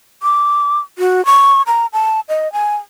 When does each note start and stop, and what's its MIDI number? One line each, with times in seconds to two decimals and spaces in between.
0.23 0.79 86
0.98 1.25 66
1.26 1.62 85
1.67 1.86 82
1.93 2.20 81
2.29 2.51 75
2.53 2.76 80